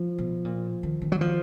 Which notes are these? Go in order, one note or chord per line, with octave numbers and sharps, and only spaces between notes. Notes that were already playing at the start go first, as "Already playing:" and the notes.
Already playing: F3
B2
A#2
D#3
D#3
F#3
F3